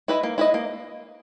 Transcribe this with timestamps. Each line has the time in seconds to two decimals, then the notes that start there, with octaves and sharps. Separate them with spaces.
0.08 E4 B4 D#5
0.23 A#3
0.38 E4 B4 D#5
0.54 A#3